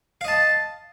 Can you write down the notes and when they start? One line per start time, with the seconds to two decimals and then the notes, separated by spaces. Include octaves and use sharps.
0.21 F5
0.25 D#5
0.28 A5